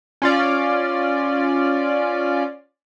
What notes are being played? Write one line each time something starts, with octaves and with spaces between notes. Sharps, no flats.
C#4 F4 D5